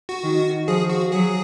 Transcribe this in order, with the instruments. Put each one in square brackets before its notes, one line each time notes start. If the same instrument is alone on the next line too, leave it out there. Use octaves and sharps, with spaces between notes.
[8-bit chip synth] F#4
[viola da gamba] D#3
[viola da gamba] F3 [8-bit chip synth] G#4
[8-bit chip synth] F#4
[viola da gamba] F#3 [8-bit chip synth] G#4